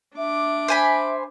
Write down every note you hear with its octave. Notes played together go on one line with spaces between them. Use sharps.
D4 E5 D6
C5 G#5 B5